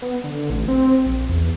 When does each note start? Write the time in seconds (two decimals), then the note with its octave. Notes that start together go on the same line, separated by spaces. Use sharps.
0.02 B3
0.24 D3
0.50 A1
0.68 C4
1.06 A#1
1.29 E2